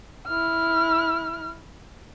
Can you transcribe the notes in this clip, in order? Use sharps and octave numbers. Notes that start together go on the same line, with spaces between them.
E4 F6